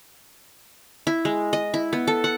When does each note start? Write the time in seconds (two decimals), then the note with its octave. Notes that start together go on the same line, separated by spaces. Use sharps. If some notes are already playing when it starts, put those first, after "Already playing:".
1.07 E4
1.25 G#3
1.53 D#5
1.74 E4
1.93 B3
2.07 A4
2.24 F#5